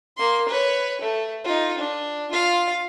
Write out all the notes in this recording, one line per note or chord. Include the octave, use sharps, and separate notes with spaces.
A#3 C6
B4 C#5
A3
D#4 F4
D4
F4 F5